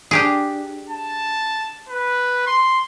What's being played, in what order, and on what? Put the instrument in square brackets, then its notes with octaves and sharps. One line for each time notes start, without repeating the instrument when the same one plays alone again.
[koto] D4 G4 G#4
[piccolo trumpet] A5
B4
C6